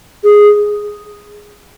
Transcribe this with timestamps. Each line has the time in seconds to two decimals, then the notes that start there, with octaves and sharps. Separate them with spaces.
0.24 G#4